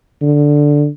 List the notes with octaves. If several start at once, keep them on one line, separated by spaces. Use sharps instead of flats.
D3